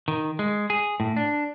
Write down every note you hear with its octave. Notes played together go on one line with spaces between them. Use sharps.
D#3
G#3
G#4
A2
D4